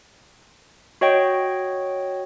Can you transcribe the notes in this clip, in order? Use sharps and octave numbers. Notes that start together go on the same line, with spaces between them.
F#4 C#5 D#5 G5